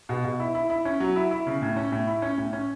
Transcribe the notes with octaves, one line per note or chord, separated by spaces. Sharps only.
B2
B2
E4
E4
E4
C#4
F#3
E4
E4
C#3
A2
C#4
A2
E4
C#4
A2
C#4